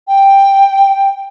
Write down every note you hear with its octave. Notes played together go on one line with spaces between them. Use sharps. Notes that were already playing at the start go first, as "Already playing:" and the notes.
G5